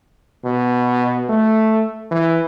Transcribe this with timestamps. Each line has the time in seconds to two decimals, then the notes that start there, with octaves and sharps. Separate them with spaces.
0.45 B2
1.29 A3
2.11 E3